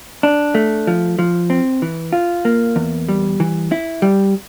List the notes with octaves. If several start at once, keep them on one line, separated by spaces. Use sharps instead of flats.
D4
A3
F3
F3
C4
E3
F4
A#3
E2
G3
E3
E4
G3